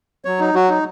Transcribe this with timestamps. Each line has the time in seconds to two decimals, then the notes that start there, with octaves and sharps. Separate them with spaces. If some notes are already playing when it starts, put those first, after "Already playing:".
0.25 F#3 C#5
0.40 D#4
0.54 F#3 F#4
0.69 D#4